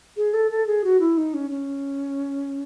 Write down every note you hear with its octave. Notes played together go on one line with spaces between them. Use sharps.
G#4
A4
A4
G#4
F#4
E4
D#4
C#4
C#4